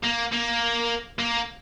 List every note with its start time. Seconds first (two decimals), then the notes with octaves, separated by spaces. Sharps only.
0.03 A#3
0.32 A#3
1.19 A#3